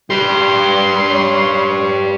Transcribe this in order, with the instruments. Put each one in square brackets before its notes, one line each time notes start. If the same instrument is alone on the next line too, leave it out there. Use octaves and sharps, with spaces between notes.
[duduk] G3 [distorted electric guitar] G4 B4 [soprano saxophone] C6
[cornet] C#5